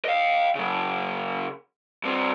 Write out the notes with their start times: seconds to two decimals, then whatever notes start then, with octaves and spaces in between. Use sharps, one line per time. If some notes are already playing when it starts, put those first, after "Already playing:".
0.05 D#5 F5
0.55 C#3 F#3
2.03 G2 C4